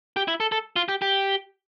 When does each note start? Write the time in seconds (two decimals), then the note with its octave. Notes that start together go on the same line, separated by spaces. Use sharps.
0.16 G4
0.28 E4
0.40 A4
0.52 A4
0.76 F4
0.88 G4
1.02 G4